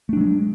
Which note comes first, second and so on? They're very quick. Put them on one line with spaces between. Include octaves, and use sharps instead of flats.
A3 D4 F#3 G#3